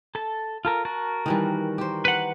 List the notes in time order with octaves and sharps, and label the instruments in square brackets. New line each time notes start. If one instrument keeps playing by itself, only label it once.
[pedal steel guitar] A4 A5
F4 A4 A#4
F#4 A#4 A5
[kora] D#3 E3 G3
G4 C5
[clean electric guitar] B4 F#5